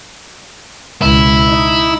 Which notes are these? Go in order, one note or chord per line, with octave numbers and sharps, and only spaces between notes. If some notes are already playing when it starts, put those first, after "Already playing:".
C#2 B2 E4
D#4